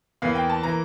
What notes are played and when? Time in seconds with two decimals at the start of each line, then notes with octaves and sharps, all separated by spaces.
0.22 E2 E3 A#3 F5
0.35 G5
0.49 A5
0.63 E3 A#3 A#5